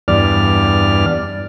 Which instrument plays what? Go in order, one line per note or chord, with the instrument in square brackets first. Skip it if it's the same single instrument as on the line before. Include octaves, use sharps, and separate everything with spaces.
[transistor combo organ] E2 G2 D5 F6